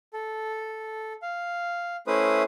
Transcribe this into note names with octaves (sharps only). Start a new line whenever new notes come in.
A4
F5
A3 C#4 E4 B4 C5 D#6